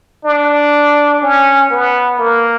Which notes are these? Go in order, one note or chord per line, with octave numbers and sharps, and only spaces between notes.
D4
C#4
B3
A#3